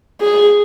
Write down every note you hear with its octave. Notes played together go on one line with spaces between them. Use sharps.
G#4